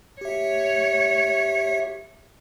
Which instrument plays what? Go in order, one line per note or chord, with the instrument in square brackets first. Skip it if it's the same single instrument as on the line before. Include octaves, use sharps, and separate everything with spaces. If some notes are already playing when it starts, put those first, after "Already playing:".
[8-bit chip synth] G4 E5 [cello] C#5